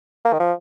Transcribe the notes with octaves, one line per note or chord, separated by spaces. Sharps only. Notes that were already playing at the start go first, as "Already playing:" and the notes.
A#3
D#3
F3